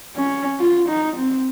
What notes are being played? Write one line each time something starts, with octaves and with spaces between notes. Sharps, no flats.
C#4
F4
D#4
C4